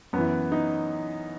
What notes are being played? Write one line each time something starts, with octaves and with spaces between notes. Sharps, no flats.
F#2 E3 B3
D#4